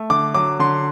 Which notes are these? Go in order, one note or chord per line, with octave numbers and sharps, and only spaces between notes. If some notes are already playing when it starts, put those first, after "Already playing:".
Already playing: A3
D3 D6
F#3 D6
D3 C6